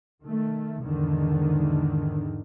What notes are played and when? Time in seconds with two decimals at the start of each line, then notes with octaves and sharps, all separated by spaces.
0.22 D#3 A3
0.82 E2 G#2 D3 D#3